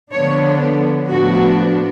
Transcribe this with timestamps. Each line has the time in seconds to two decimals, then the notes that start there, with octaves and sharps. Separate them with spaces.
0.12 D3 F3 B3 D4 C#5
1.09 A2 F3 B3 D4 F#4